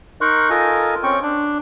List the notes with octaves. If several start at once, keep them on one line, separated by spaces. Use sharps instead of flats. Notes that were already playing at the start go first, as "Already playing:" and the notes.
D#4 A#4 C6 C#6 F#6
F4 A4 A#4 D#5 G#5
C4 C#4 G5 C#6
D4